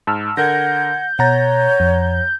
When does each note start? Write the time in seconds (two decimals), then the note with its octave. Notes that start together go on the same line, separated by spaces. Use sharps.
0.07 G#2 A5 E6 F6
0.37 D3 A#4 F#5 G6 G#6 A#6
1.19 B2 C#5 F#5 A#5 A6
1.80 F2